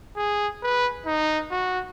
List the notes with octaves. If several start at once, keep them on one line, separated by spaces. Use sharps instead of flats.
G#4
B4
D#4
F#4